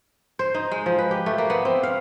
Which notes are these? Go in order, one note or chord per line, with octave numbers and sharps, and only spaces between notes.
C5
D#4
G#3
F3
B4
G4
A3
A#3
B3
C4
F5